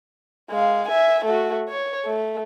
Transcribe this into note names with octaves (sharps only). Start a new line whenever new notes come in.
G#3 F5
E5 G#5
A3 F#4
C#5
A3